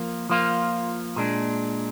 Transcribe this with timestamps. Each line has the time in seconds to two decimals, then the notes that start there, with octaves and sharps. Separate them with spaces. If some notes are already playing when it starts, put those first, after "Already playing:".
Already playing: F3 A#3
0.29 F3 A#3 F4
1.16 A#2 G#3 D4